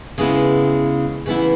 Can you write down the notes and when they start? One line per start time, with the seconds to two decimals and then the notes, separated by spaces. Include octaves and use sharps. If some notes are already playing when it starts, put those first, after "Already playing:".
0.18 C#3 G#3 B3 E4
1.26 C#3 E3 B3 E4